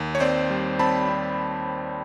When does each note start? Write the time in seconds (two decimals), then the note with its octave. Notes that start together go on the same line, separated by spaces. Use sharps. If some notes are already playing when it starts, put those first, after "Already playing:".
Already playing: D#2
0.15 C#5
0.20 C4 C5 D5
0.50 G3
0.79 C4 A5 B5
1.09 C4